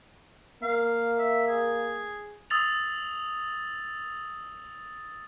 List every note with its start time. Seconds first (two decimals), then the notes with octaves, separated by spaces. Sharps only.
0.63 A#3 F5
1.18 E5
1.48 G#4
2.50 D#6 E6 A6 F7